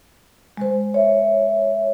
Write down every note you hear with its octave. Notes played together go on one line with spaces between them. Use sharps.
G#3 C5
C#5 E5